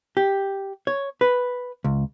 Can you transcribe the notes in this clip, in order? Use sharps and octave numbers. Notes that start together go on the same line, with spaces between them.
G4
C#5
B4
C#2